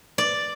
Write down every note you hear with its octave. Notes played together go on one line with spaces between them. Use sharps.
D5